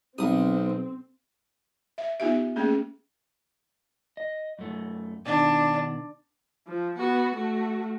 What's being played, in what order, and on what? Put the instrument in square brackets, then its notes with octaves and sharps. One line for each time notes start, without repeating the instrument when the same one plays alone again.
[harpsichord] B1 D#6 [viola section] C4
[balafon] E5
B3 D#4 F4 G4 E5
A3 A#3 C#4 G#4
[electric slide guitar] D#5
F#2 A3
[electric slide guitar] B2 D#3 [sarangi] D4
[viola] F3
B3 F#4
A3 F#4